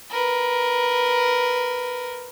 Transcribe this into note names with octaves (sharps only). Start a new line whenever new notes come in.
A#4 B4